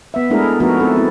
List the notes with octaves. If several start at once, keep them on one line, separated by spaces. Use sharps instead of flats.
B3 E5
G#3 A3 D4 E4 G#4 A#4
F3 A3 B3 D#4 F#4 A#4
C4 A4
C4 E4